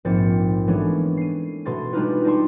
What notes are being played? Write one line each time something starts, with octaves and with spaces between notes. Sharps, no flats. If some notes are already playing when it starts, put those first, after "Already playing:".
A#1 G#2 C4 A6 C#7
E3 G#3 A3 B3 C#4 D4
C7 D#7
B2 A3 C6 C#6 A6
G3 G#3 D4 D#4 F4 B4
D#4 G4 D5 A5 C6 C#6